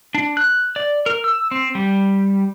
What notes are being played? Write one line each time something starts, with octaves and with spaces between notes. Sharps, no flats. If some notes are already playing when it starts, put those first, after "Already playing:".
D4
F#6
D5
A#4
E6
C4
G3